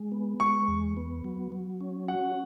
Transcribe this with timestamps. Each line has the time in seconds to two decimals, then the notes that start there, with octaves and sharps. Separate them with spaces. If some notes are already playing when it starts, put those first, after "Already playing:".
Already playing: G#3
0.12 B3
0.40 G#3 C#6
0.68 E2
0.97 B3
1.24 F#3
1.52 F#3
1.81 C#4
2.08 F#4 F#5